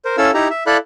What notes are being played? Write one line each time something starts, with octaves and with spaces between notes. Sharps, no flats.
A#4 C5
C#4 E4 A4 F5 E6
D#4 E4 G4 A#5
E5
E4 A4 D5 F5 B5 F#6